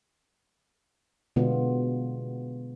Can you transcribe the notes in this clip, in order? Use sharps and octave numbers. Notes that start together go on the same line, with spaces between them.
B2 D3 G#3 B3 F4